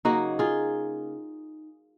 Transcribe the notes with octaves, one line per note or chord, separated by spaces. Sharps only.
C#3 F#3 A#3 D#4 F#4
F4 G#4